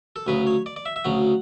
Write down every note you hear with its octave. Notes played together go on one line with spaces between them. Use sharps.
A4
D2 C#3 F#3 B4
C#5
D5
D5
E5
E5
D2 C#3 F#3 F#5